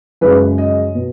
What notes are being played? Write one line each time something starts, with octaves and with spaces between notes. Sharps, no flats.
F#2 C#3 G#3 B4
D#5
B2